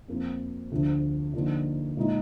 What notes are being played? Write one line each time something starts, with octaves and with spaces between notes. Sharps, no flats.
F2 F3 A#3
D2 D3 F3
D3 F3 A#3 D#4
A#2 G#3 D#4